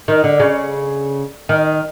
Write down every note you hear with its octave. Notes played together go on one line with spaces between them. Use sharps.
D#3
D3
C#3
D#3